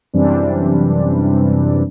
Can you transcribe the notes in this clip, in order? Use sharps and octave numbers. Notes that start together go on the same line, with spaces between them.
F#2 C3 E3 G3 C4 D4